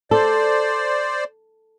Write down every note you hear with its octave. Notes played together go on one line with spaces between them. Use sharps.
A4 C5 D5